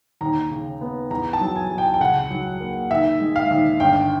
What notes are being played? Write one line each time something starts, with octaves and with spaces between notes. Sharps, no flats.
D#2 A#5
C#3
B3
E2 A#5
A5
F#3
G#5
E2
G5
G5
C#2 F#5
F#3
A#3
D#3 E5
G#3
F5
D#2
G1 G5